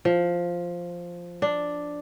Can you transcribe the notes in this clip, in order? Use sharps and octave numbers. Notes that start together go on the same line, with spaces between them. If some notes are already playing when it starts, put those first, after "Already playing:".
F3
D4